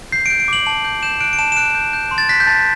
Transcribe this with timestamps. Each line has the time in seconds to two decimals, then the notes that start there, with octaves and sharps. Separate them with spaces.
0.12 G6 C7
0.26 D7
0.30 G6
0.40 D7
0.48 D6 F#7
0.66 A5 F#7
0.85 G6
1.03 G6 E7
1.20 F#6 D7
1.33 D7
1.39 A5 E7
1.52 E7
1.57 F#6 D7
1.75 G6
1.93 G6
2.11 C6
2.18 A6
2.29 F#6 B6
2.40 G6
2.47 A5 A6